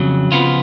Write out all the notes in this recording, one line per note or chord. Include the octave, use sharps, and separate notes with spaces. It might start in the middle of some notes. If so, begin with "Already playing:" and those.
Already playing: F2 C#3 F#3
C#3 F3 B3 F4